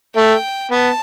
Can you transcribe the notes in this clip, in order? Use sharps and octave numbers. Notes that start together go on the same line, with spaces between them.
A3 G5
B3 A5